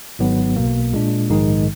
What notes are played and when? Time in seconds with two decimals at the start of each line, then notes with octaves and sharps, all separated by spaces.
0.19 G#1 G#2 F#3 B3
0.56 B1 B2 A#3
0.93 A#2 G#3 D4
1.29 A#1 G#2 D#3 G#3 D#4